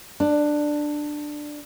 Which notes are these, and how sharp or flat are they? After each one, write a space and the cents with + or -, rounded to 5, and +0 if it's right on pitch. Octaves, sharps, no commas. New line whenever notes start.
D4 +10